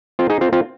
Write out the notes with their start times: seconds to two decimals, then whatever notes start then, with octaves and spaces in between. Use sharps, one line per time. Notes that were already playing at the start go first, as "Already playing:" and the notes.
0.19 C4 F4
0.30 D#4 G#4
0.41 C4 F4
0.53 C4 F4